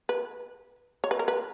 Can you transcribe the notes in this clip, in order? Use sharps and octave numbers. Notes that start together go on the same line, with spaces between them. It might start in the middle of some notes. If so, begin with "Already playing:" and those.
B4
C#5
B4
A#4
B4